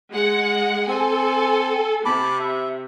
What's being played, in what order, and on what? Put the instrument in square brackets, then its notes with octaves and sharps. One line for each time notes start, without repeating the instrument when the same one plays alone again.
[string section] G#3 F#5
[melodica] C4 [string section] A4 G#5
[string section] C3 [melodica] A5 B5 D6
[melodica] E5